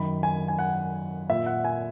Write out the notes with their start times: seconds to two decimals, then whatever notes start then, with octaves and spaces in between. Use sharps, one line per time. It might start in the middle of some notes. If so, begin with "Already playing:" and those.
Already playing: F#2 D#3 B5
0.23 G#5
0.48 G#5
0.59 F#5
1.30 A#2 E5
1.46 F#5
1.65 G#5